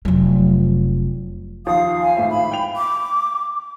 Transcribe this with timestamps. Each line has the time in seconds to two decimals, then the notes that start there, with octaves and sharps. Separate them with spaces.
0.05 F1 F#3
1.66 D#2 F3 F5 D#6
2.02 G#5
2.17 G#1 A2 E5
2.30 B5
2.52 G5 F7
2.76 D6